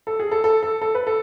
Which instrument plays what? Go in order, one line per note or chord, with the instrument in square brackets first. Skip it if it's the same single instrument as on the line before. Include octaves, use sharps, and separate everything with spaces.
[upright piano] A4
G#4
A4
A4
A4
A4
B4
A4